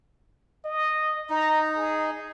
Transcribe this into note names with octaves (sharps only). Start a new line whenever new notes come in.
D#5
D#4 A#5
G#4